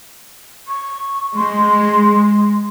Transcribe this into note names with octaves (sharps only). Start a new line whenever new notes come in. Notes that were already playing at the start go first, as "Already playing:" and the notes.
C#6
G#3 C6